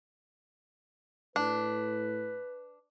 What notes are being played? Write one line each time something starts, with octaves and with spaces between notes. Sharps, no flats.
A2 D4 B4